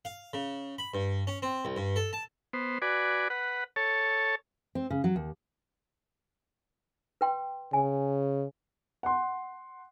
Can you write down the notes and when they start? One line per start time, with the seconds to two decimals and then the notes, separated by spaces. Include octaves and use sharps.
0.05 F5
0.33 C#3
0.78 B5
0.94 G2
1.27 C#4
1.42 C4
1.65 C2
1.77 G2
1.96 A4
2.13 A5
2.53 B3 C5
2.82 F#4 B4 D5 G#5
3.30 B4 F#5
3.76 A4 C#5 A5
4.75 C4
4.90 C#3
5.04 F#3
5.16 D#2
7.21 B4 G5 C6
7.73 C#3 G#5
9.03 F#5 C6